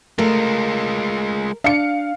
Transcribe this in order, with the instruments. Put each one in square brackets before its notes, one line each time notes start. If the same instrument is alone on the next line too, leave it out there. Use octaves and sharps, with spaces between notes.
[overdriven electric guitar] G#3 F4 [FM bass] A3 [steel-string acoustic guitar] A#4
[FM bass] D4 [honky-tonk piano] F5 C#7